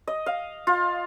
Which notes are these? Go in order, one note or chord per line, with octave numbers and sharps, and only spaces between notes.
D#5
F5
F4